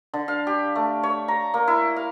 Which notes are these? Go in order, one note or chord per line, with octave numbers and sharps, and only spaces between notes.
D3
F5
G4
A3
C#5
A#5
A#3
E4
F5